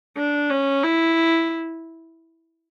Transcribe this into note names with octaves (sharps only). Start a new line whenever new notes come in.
D4
C#4
E4